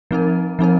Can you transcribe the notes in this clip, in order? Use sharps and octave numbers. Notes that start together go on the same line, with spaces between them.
F3 C4 D#4 A#4
F3 C4 D#4 A#4